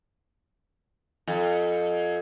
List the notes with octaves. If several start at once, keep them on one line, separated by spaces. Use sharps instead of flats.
F2